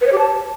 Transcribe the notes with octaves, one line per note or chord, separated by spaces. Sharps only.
B4
C#5
G4
A5